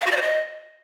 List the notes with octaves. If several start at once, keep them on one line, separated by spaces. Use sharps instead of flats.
F5
F#4
D5
C5
D#5